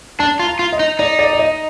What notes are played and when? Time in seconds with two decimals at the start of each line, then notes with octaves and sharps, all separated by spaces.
0.19 D4 A5
0.39 F4
0.46 A#5
0.59 F4
0.73 D#5
0.79 D#4
0.99 D#4 D5
1.19 D5
1.33 D5
1.39 D#5